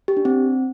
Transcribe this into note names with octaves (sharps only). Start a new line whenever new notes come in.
G4
D4
C4